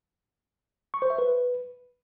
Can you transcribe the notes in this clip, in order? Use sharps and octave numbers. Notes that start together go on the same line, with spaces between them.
C#6
C5
E5
B4